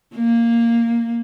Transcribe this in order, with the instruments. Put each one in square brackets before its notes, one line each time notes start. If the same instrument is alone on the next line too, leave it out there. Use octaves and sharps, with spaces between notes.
[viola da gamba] A#3